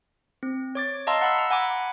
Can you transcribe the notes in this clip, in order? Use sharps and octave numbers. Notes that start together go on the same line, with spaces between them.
C4
C#5 D6 A6
D#5 F5 A5 A#5 C6 E6
F#5 B5 E6
A#5
F#5 G#5 B5 D6